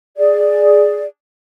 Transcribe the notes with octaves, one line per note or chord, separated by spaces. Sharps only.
G#4 D5